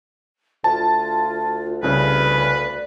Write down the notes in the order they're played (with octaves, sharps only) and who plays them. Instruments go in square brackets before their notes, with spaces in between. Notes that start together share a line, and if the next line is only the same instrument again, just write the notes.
[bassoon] D2 [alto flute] F4 [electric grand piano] A5
[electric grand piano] C2 C#3 [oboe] B4 [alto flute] D5